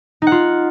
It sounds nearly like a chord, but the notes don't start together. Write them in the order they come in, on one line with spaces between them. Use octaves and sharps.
D#4 F#5 F4